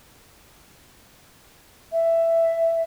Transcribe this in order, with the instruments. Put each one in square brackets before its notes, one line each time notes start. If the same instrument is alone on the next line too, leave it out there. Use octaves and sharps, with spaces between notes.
[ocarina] E5